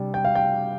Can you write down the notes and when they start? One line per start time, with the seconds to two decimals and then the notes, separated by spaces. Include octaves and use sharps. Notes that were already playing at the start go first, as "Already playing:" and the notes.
Already playing: C3 G3 D4
0.14 G5
0.25 F5
0.35 G5